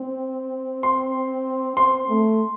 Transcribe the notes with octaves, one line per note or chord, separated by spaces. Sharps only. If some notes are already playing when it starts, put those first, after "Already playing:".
Already playing: C4
C6
C4 C6
A3